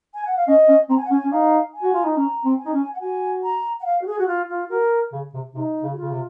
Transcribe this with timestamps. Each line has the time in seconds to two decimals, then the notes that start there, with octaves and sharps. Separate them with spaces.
0.14 G#5
0.25 F#5
0.37 F5
0.47 C#4 D#5
0.68 C#4
0.89 C4 A#5
0.97 G#5
1.05 F#5
1.10 C#4
1.13 G#5
1.24 C#4
1.31 D#4 F5
1.74 G#5
1.82 F#4
1.93 F4
2.04 D#4
2.16 C#4 A#5
2.45 C4
2.59 G#5
2.65 D#4
2.73 C#4
2.93 F#5
3.00 F#4 G#5
3.43 A#5
3.80 F#5
3.85 F5
4.02 F#4
4.06 G#4
4.19 F#4
4.27 F4
4.49 F4
4.70 F#4 A#4
5.12 C#3
5.34 C3
5.54 C3 D#4
5.83 C#3
5.93 F#4
5.97 C#3 F4
6.11 C3